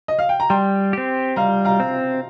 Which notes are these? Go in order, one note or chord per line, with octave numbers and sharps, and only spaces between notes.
D#5
F5
G5
A#5
G3 G5 C6
C4 G4
G3 F5 A#5
F5 A#5
C4